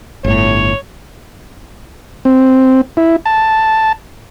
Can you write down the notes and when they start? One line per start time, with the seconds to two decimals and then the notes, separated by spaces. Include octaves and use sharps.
0.24 G1 A2 C#5
2.25 C4
2.97 E4
3.26 A5